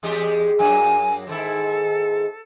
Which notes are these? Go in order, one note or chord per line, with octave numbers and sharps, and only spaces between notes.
E2 G#3 G4
F#2 F#3 A#3 G#5
G#2 D#3 E4 A4